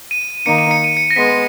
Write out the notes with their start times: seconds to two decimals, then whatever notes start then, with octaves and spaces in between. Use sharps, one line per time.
0.11 D#7
0.46 D#3 A#3 D#4 C#7
0.59 D#7
0.71 C#7
0.84 D#7
0.97 C#7
1.10 A#6
1.16 G#3 B3 B6